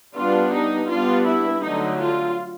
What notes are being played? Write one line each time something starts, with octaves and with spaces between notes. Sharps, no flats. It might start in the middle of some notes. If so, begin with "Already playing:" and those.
G3 B3 D4 F4
D#4
G3 B3 D4 F4
E4
D3 F#3 A3 D#4
F4